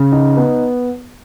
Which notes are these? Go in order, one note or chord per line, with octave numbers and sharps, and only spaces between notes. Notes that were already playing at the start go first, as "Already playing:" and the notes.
Already playing: C#3
D#4
B3